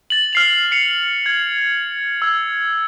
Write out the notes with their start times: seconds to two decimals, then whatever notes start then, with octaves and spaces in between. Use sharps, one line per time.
0.10 A6 F#7
0.33 F6 C7 F7
0.71 C7 C#7 F7
1.26 G#6
2.22 E6 G#6